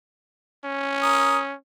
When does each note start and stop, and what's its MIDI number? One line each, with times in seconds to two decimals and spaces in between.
0.65 1.54 61
1.02 1.38 70
1.02 1.38 87